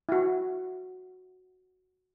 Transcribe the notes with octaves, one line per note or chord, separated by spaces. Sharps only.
E4 F#4